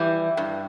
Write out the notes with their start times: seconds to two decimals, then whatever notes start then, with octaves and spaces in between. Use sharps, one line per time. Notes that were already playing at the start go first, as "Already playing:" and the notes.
Already playing: E3 G3
0.37 G2